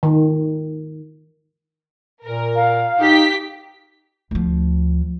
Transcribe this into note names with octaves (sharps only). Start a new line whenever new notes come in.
D#3
A#2 A#4
F5
D#4 G4 B6
D2 F3